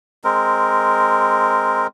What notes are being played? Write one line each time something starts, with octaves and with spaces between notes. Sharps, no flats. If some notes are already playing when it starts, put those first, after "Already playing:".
G#3 C4 A#4